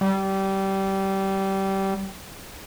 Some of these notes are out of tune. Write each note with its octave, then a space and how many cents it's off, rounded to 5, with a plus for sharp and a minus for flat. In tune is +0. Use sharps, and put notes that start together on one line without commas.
G3 -20